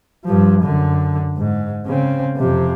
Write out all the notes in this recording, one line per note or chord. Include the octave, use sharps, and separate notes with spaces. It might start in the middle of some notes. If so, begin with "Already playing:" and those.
G2 F3
F#2 D3
G#2
C#3 C4
F2 C3